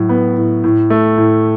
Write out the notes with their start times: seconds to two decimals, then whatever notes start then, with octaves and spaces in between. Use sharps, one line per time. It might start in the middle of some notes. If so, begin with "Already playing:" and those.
Already playing: A2 F#3
0.09 B3
0.37 A2
0.64 A2
0.90 A3
1.17 A2